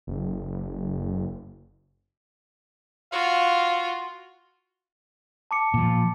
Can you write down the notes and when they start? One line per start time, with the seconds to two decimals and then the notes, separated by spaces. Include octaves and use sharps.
0.07 F#1
3.12 F4 F#4 F5
5.51 A5 D6 C#7
5.74 A#2 F3